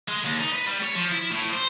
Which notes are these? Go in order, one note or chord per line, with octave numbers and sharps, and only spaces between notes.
G#3
D#2
D#4
B4
G3
C#5
F3
E4
A2
C5